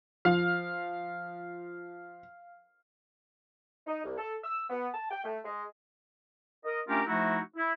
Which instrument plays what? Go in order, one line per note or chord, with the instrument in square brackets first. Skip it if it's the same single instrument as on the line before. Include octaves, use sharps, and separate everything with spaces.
[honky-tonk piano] F3 [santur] F5
[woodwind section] D#4
C2
A4
E6
B3
A5
G5
A3
G#3
A#4 D#5
A3 C#4 D4 F4 G4 A#4
F3 A3 D#4 E4 F#4
E4